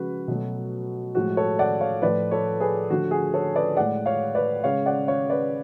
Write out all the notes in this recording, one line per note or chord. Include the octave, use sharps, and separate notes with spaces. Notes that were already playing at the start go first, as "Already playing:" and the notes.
Already playing: C#3 F3 G#3 F#4 B4
B2 F#3 A3
A2 F3 G#3 F#4
A4 C#5
D5 F#5
C#5 F5
A2 F3 A3 B4 D5
A4 C#5
G#4 B4
D3 F3 A3 F#4
G#4
A4 C#5
B4 D5
A2 G#3 D5 F#5
C#5 F5
B4 D5
C#3 G#3 C#5 F5
D5 F#5
C#5 F5
B4 D5